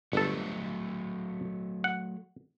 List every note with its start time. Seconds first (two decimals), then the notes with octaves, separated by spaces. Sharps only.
0.13 G1 F#3 A3 A4
1.84 F#5